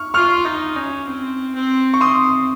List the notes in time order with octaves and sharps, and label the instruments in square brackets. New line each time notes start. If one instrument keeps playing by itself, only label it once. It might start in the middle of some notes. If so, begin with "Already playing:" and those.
Already playing: [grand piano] C#6 F6
[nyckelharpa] F4 [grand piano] C#6 F6
[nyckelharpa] D#4
C#4
C4
C4
[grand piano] C#6
[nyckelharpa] C4 [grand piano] C6 D#6